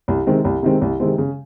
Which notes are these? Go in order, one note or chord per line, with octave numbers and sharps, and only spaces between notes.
C2
C3 D#3 G#3 C4
C2
C3 D#3 G#3 C4
C2
C3 D#3 G#3 C4
C#3